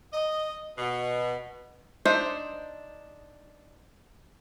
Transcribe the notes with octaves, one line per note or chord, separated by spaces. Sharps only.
D#5
B2
D4 D#4 C5 E5